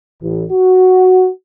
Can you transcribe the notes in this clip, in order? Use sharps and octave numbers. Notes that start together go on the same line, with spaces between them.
A1
F#4